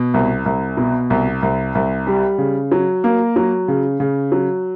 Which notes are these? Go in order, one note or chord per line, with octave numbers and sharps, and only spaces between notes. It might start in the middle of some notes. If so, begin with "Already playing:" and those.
Already playing: B2
C2
C2
B2
C2
C2
C2
G3
C#3
F#3
A#3
F#3
C#3
C#3
F#3